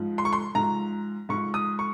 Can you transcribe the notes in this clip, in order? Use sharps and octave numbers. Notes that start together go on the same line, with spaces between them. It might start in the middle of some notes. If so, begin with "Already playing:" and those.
Already playing: G#2 F3
C6
C#6
C6
G#2 F3 A#5
G#2 F3 C#6
D#6
C#6